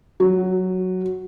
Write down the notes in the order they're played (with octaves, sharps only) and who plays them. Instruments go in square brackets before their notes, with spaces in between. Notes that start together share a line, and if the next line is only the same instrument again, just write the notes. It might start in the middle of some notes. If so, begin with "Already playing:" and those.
[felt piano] F#3